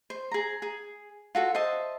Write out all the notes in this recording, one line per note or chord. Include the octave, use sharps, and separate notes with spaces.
C5
G#4 A#5
G#4
F4 F#4 A4
C5 D#5 E5 A5